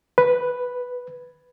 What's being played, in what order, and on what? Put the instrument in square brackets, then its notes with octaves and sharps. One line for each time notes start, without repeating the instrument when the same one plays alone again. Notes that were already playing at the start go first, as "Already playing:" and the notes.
[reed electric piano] B4